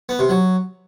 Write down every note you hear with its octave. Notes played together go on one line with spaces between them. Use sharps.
B3
C3
F#3